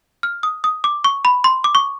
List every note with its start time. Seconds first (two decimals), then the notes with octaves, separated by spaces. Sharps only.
0.23 F6
0.43 D#6
0.64 D#6
0.84 D6
1.04 C#6
1.25 B5
1.44 C6
1.64 D6
1.75 C#6